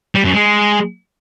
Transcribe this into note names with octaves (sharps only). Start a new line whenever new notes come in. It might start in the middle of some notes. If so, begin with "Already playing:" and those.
G3
F#2
G#3